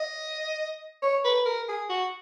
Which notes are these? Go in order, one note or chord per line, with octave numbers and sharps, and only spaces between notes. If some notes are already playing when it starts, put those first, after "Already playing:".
Already playing: D#5
C#5
B4
A#4
G#4
F#4